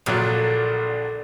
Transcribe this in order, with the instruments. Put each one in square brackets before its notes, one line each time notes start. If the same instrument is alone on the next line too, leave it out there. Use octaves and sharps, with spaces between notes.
[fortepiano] A#1 A#2 F#3 [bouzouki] D3